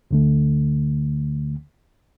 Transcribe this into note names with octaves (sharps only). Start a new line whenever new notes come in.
D2 D3 A3